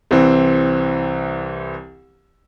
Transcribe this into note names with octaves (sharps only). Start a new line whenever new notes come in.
C2 E3 C4